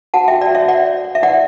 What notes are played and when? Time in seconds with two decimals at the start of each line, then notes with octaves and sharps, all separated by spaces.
0.14 F#4 F#5 A5
0.28 F#4 E5 G5
0.41 D5
0.51 F#4 C#5 E5
0.68 C#5 D5 F#5
0.87 C#5
1.05 C#5
1.15 E5
1.23 E4 D5 F#5